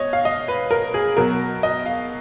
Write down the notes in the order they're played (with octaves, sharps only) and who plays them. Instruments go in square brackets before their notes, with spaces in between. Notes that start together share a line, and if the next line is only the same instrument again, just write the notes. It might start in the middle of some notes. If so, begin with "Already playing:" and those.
Already playing: [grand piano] B2 C#5 D#5
F5
D#5
B4
A#4
G#4
B2 F#3 A#4
D#5
F5